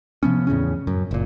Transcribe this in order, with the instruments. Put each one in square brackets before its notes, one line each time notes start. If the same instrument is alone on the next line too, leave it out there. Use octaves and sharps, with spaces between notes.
[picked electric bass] C3 F3 B3 C#4
E2 A2 C#3 C#4
F#2
F#1 A#2